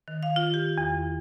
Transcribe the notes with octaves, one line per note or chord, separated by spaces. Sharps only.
D#3
F5
F4
G4
E2